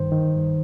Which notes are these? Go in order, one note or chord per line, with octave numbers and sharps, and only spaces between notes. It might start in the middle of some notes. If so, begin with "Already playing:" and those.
Already playing: G2 D#3 C5
D#3
G2